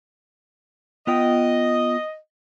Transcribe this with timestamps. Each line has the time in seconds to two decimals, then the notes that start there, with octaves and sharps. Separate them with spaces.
1.07 B3 F4 D#5 G5